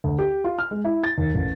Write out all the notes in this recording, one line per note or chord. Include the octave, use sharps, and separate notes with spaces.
D2
G4
F4
F6
G#3
E4
A6
D#2
A1